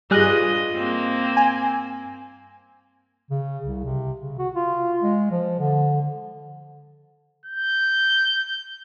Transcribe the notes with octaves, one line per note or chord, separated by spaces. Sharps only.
G2 G3 F4 G#4 D#5 F#6
A#3 C4
G#5
C#3
C2
C3
C#3
F#4
F4
G#3
F3
D3
G6